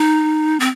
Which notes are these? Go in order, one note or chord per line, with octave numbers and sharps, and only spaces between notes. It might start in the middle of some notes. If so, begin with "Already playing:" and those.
Already playing: D#4
C4